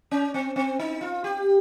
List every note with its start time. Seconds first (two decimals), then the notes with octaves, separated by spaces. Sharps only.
0.11 C#4
0.34 C4
0.56 C4
0.79 D#4
1.01 F4
1.24 G4